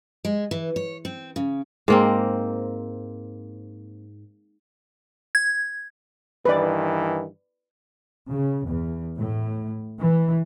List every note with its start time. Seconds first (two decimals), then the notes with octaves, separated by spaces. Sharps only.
0.25 G#3
0.51 E3
0.76 C#5
1.05 C4
1.36 C#3
1.88 G#2 A#3 C4
5.35 G#6
6.45 G2 D#3 E3 B4 D5
8.30 C#3
8.67 E2
9.17 A2
9.99 E3